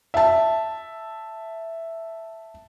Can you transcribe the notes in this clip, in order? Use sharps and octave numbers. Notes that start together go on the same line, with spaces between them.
E5 A5